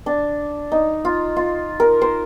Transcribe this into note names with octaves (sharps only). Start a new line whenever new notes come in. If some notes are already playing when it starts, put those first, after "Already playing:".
D4
D#4
F4
F4
A#4
C5